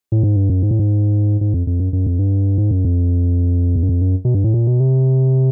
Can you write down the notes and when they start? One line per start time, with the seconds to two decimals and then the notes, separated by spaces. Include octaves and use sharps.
0.12 A2
0.23 G#2
0.36 G2
0.49 F#2
0.63 G#2
0.71 A2
0.79 G#2
1.41 G#2
1.54 F2
1.67 F2
1.80 F#2
1.93 F#2
2.06 F2
2.19 G2
2.58 G#2
2.71 F#2
2.85 F2
3.76 E2
3.83 F#2
3.89 F2
4.02 F#2
4.25 B2
4.35 G2
4.44 A2
4.54 A#2
4.67 B2
4.80 C3